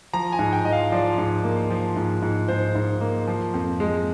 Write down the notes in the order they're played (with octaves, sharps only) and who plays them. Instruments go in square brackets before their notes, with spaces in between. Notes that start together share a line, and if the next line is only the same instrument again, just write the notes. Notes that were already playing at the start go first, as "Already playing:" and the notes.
[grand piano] F3 A#5
G#5
G#2
G5
F3 D#5
F5
F3 D5
G#2
A#3
F3
G#2
G#2
G#2 C5
G#2
A#3
F3
F2
G#3